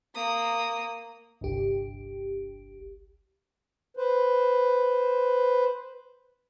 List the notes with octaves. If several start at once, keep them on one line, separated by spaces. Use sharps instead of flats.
A#3 D#6
G1 C2 G4
B4 C5